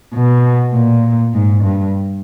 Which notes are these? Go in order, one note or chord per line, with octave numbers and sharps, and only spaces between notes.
B2
A#2
G#2
G2